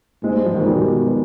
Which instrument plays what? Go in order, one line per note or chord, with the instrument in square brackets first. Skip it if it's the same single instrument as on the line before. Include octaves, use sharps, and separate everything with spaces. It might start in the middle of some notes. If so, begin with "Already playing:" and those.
[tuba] G#2 [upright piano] G#3
[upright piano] G3
F3
D#3
G3
[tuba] B2 [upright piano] F3